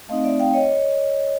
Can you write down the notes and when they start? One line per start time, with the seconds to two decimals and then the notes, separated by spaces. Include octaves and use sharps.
0.09 A3 C4 D#4 D#5 F5
0.24 D5 E5
0.39 F5 G5
0.54 C#5 D#5